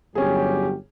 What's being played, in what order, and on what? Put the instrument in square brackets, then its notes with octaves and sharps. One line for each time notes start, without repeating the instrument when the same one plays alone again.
[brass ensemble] G1 F#3 G4 [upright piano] C#4 G#4